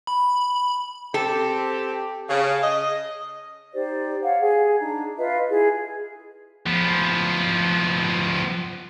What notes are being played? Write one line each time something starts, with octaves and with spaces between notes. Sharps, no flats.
B5
C4 G4 A4
C#3 F5
D#5
D#4 G4 C5 D5
C#5 F5 F#5
G#4
D4 D#4 A#5
F4 B4 D#5 E5
E4 G#4
F3 B3